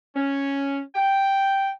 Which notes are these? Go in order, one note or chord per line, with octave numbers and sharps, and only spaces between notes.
C#4
G5